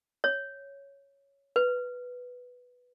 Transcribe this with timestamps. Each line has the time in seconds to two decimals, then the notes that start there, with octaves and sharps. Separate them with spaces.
0.24 C#5
1.56 B4